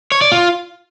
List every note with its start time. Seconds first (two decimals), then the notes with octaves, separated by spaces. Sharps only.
0.12 C#5
0.22 D5
0.32 F4